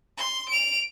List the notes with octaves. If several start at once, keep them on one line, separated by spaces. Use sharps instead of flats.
C6
D7 F7